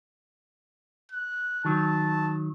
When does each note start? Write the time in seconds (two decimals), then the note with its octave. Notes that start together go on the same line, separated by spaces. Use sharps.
1.12 F#6
1.65 D#3 F#3 A5